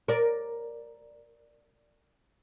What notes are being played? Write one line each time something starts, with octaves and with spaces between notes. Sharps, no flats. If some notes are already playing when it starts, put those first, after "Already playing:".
A#4 D5